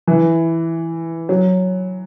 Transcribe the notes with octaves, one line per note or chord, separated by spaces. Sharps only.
E3
F#3